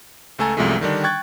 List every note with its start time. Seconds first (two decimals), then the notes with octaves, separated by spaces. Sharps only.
0.39 C#2 A3 A4 G#5 A#5
0.57 C2 F#2 C3 F3 G#3 A3
0.81 D3 D#3 G3 D4
1.04 G5 C#6 F#6 G#6 A6